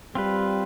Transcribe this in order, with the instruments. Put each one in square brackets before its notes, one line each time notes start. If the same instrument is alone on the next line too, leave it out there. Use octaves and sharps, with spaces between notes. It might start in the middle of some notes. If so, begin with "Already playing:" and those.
[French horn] G3 [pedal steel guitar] C4 F4 B4